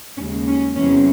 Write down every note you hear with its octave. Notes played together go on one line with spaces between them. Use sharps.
D#2 C#3 G#3 C#4
C#4
E2 C3 F#3 C#4